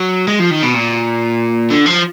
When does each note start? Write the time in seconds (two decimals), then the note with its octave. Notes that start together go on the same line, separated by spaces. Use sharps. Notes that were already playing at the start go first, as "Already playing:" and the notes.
Already playing: F#3
0.28 G#3
0.40 F3
0.51 D#3
0.63 B2
0.75 A#2
1.71 D3
1.86 F3